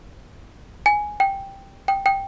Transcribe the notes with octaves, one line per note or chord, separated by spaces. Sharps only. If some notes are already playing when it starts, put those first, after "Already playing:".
G#5
G5
G5
G5